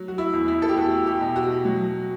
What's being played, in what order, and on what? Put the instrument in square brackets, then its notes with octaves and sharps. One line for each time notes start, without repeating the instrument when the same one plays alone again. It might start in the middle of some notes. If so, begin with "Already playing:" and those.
Already playing: [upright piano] F#3
F#4
E4
E2
E4
A4
G4
E2 F#4
G4
B2
F#4
F#3